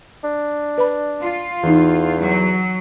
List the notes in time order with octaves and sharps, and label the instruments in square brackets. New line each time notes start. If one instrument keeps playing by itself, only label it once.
[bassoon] D4
[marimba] B4 D5 B5
[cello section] F4
[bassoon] E2 [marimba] E3 D#4
[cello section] F#3